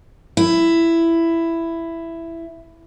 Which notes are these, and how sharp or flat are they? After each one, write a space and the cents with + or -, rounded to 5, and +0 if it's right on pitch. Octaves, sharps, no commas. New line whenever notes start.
E4 +10